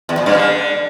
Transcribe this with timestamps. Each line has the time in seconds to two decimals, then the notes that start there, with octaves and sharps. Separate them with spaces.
0.09 E2
0.18 A#2
0.26 G2
0.35 D3